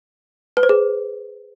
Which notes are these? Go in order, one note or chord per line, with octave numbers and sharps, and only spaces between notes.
B4
C5
G#4